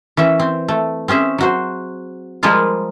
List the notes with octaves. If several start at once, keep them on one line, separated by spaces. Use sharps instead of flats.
E3 C#4 E5
C4
A3
C4 C#4 G#4 E5
F#3 F#4 C5
F3 G3 G#3 A#3 F4